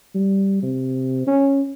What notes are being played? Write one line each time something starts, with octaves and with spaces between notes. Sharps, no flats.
G3
C3
C#4